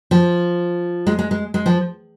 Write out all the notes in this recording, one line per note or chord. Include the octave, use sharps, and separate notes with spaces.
F3
G#3
G#3
G#3
G#3
F3